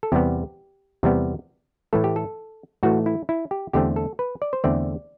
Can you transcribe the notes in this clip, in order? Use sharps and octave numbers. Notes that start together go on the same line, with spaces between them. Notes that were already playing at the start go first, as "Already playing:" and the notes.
A4
E2 C3 G3 B3 G4
E2 C3 G3 B3
A2 E3 A3 A4
G4
A4
A2 E3 A3 F#4
E4
E4
G4
E2 D3 A3 C4 G4
A4
B4
D5
C5
E2 D3 A3 C4 D5